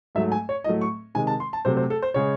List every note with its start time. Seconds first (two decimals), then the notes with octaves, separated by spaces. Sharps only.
0.15 G#2 F#3 A3 E5
0.32 G#5
0.49 C#5
0.64 A2 F#3 A3 D#5
0.81 C#6
1.15 C3 D#3 G#3 G#5
1.27 A5
1.40 C6
1.53 A5
1.65 C3 F#3 A3 C5
1.77 C5
1.90 A4
2.02 C5
2.14 C#3 G#3 C#5